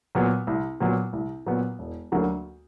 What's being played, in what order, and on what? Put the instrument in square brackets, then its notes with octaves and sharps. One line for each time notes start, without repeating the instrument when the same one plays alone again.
[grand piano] A#2 F#3 B3
C2
A#2 F#3 B3
C2
A#2 F#3 B3
E1
D2 D3 F#3 A#3